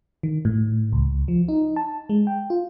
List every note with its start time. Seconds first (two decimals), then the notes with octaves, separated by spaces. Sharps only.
0.23 D#3
0.45 A2
0.92 C#2
1.28 F3
1.48 D#4
1.76 A5
2.09 G#3
2.27 G5
2.50 F4